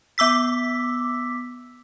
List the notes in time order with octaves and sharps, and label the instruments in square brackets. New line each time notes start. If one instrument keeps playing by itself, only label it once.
[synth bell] B3 D6 E6 B6